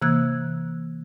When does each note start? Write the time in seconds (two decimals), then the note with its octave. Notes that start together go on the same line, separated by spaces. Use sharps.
0.02 C3 E3 A#3 E6 F#6 G#6